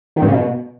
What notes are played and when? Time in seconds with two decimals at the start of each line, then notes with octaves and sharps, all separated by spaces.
0.16 D#3
0.22 G2
0.28 C#3
0.33 B2